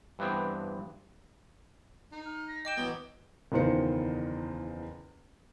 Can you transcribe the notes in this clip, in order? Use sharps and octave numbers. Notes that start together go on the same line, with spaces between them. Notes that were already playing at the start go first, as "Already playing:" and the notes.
G2 E3 B3 C4 D4
D#4
F6
A#6
D#5 G5 D6 E7
E3 F#3 B3
F#1 E2 D#3 F4 C5 C#7